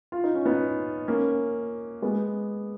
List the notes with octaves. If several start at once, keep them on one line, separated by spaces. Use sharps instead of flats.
F4
D#4
C#4
B3 D#4
A#3 C#4
G#3 B3